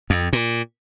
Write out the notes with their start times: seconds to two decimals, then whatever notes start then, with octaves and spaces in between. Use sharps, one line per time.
0.10 F2
0.33 A#2